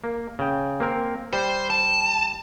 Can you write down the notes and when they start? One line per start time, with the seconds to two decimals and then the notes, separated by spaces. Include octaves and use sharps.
0.04 A#3
0.39 C#3 G5
0.80 A#3 C4 A#4
1.33 G3 C5
1.70 A5